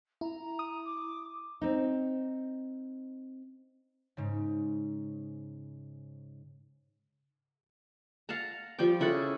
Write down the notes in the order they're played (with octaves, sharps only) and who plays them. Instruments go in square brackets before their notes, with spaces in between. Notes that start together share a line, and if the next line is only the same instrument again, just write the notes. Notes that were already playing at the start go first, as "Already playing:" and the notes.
[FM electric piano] E4 [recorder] A#5
[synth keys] D#6
[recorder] D6
[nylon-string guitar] C4 D#4
[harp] G#2 C#3
[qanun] F5 F#5 A5 A#5
F3 G3 G5 D6
C#3 E4 A4 F#5